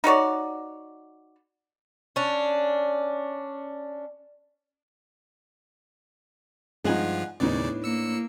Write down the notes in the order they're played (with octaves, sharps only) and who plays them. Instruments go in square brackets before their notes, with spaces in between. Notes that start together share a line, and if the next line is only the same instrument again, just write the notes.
[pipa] D#4 F#4 C#5 D5
[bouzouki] C#4 D4
[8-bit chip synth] G2 F3 F4 [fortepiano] G#3 D#4 [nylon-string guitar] D#5 F#5 G#5
[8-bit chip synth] D#2 C#3 D5 [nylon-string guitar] A2 D4 [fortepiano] B3 D#4
[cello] A#3 [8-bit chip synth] E6 C#7